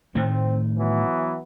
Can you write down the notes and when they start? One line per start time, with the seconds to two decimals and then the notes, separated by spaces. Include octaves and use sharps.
0.15 A2 D#3 A3 C4
0.77 E3 F#3 B3